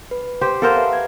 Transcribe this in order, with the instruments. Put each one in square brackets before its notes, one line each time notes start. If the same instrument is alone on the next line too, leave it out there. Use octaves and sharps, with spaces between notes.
[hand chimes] B4
[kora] G4 C5
[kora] A4 A#4 C5 [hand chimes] F5 F#5
[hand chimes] B4 E5
G#6